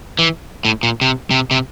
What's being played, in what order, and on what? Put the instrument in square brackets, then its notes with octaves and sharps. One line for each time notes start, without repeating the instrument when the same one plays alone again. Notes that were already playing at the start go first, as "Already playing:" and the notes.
[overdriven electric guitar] E3
A2
A#2
C3
C3
C3